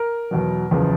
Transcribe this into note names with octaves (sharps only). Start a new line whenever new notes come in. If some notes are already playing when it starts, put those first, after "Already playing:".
Already playing: A#4
E2 B2 F#3
F#1 E2 C#3 F3